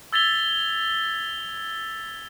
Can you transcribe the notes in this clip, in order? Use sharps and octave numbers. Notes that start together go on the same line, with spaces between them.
E6 G#6 A6 B6 F7 G7